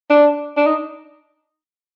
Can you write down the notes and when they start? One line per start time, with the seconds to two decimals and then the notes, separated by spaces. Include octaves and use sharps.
0.10 D4
0.57 D4
0.66 D#4